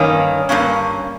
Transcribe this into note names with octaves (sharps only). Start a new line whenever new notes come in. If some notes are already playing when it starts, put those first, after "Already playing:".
Already playing: G2 D#3 A#3 C#4
G2 D#3 A#3 C#4